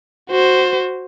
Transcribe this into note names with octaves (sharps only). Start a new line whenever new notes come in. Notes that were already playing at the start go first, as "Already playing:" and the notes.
F#4 C5